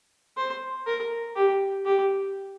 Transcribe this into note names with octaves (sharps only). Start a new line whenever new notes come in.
C5
A#4
G4
G4